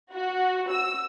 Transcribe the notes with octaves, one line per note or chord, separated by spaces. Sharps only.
F#4
E6